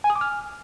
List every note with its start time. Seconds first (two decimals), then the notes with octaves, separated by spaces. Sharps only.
0.04 G#5
0.10 D#6
0.16 D6
0.21 F6